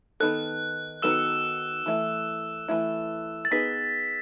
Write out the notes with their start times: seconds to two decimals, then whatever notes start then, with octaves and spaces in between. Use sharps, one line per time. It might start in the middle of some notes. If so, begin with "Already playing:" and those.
0.20 D#3 F#3 B3 D#4 A4 F#6
1.02 D#3 F#3 B3 D#4 A4 E6 E7
1.86 E3 A3 E4
2.68 E3 A3 E4
3.45 A6
3.51 B3 D#4 G#4 B4 B6